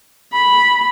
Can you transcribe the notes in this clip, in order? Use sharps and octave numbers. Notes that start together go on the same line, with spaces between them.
B5